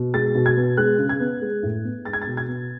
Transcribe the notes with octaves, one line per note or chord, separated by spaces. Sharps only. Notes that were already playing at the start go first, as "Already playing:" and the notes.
Already playing: B2
G#3 A6
B2
G#6
B3
G#3 F#6
C#3
G#6
B3
G#3
A2
B3
G#3 A6
G#6
A6
B2
G#6
B3